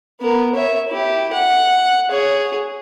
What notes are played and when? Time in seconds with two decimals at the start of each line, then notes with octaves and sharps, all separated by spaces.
0.20 B3 A#4
0.55 C#5 E5
0.88 E4 G4
1.33 F#5
2.10 G#4 C#5